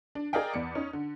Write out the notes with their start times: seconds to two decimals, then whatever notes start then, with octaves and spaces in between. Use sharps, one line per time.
0.15 D4
0.33 G#4 A#4 D5 D#5 F5 G5
0.54 E2 D5 C#7
0.75 C#4 D#4
0.93 D3